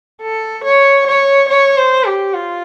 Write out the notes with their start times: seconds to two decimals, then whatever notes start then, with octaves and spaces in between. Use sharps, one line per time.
0.21 A4
0.64 C#5
1.07 C#5
1.49 C#5
1.77 C5
2.05 G4
2.34 F4